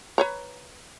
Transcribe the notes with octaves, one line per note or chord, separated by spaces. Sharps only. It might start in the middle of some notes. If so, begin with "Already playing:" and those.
B4 C#5 A#5